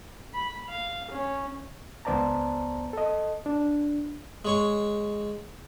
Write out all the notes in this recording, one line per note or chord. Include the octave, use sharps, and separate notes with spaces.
B5
F5
C#4
C#2 B3 C5 D5 A5 A#5
A4 D#5
D4
G#3 C#5 C#6